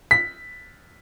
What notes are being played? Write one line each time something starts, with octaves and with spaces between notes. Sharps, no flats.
B6